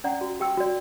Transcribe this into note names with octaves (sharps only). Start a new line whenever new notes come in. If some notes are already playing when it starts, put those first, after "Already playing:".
C#4 D5 F#5 A#5
F#4
G4 G5 E6
F#4 D5